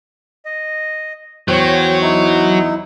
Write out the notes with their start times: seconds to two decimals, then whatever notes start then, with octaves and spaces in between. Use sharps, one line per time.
0.45 D#5
1.48 E2 F#3 C5 C#5 G5 C#7
2.02 D#4 E4